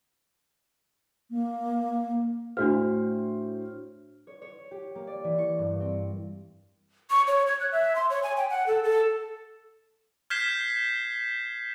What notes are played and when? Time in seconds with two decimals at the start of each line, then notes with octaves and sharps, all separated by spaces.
1.31 A#3
2.57 A2 D4 F#4 C5 F6
4.27 C#5
4.42 C#5
4.71 G4
4.95 A#3
5.07 D5
5.24 E3
5.38 C#6
5.59 G2
5.80 C4
7.10 C#6
7.28 C#5
7.47 G#6
7.60 F#6
7.72 E5
7.96 C6
8.10 C#5
8.23 G#5
8.37 G5
8.50 F#5
8.67 A4
8.83 A4
10.30 F6 G6 G#6 B6 C7 E7